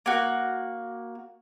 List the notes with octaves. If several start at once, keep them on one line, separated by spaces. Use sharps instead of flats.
A#3 F#4